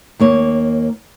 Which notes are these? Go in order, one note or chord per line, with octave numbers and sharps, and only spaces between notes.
D#2 A#3 C#5